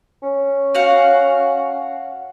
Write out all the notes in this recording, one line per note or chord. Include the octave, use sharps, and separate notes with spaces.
C#4
F#4 F5 F#5